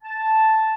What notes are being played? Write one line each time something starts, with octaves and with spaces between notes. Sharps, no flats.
A5